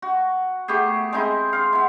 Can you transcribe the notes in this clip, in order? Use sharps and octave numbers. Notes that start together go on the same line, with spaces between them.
F#4
A3 B3 G4 G#4
G#3 C4 D#4 E4
F5 C6
B3 E4